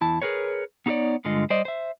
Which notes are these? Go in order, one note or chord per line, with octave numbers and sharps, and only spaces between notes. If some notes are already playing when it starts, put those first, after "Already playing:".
E2 E4 A5
G#4 A#4 B4 C#5
B3 D#4 F#4 A4 C#5 D5
G2 D3 G#3 F4 D#5
G3 C5 D5 D#5
C5 E5